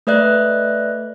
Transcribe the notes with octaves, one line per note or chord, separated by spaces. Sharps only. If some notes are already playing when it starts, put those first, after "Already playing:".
A3 B4 D5 E5 F#6